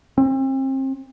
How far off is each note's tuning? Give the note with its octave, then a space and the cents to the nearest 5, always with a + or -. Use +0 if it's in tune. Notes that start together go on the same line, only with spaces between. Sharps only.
C4 +35